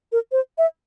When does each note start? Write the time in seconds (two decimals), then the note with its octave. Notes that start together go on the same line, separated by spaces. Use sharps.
0.12 A#4
0.32 C5
0.58 E5